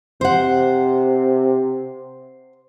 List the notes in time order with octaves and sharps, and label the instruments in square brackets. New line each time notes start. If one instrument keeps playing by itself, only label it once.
[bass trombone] C3 [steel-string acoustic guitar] C5 F#5